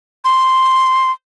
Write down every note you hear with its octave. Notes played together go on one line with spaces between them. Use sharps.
C6